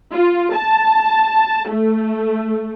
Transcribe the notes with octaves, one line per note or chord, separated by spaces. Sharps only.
F4
A5
A3